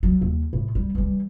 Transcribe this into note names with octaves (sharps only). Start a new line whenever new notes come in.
F#3
D#2
A2
G3
E3 G3